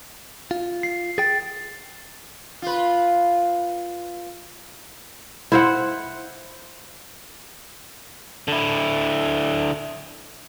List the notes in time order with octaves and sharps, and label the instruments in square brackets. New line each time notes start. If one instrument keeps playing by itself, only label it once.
[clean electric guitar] F4
[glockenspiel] C7
[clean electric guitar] G#4 G5 [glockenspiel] A6
[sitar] F4 B4
[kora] E4 C5 F#5
[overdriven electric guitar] D3 E4